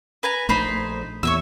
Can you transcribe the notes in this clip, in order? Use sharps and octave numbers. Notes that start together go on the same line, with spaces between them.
B4 G#5 A#5
A#1 A3 D#4 C5 B5
E2 A#2 C#5 E5 E6